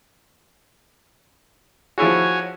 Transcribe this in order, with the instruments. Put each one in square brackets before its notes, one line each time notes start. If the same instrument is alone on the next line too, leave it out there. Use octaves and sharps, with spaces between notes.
[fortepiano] F3 E4 G#4 [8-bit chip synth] F#4 C#5 G#5